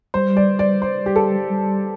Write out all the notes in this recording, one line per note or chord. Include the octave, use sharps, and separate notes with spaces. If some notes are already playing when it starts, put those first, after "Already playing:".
G3 C5
D5
D5
C5
G4
A4
G3